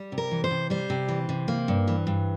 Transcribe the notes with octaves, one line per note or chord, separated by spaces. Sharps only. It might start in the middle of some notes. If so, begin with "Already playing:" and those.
Already playing: G3
C3
A#4
E3
C5
C3
G3 C5
C3
E3
C3
A#3
G2
E3
G2